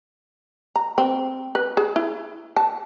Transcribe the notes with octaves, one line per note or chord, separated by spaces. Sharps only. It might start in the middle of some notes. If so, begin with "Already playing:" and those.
A#5
C4
B4
G#4
E4
A5